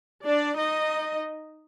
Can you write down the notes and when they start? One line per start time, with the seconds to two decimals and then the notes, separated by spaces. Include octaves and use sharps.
0.25 D4 D5
0.57 D#4 D#5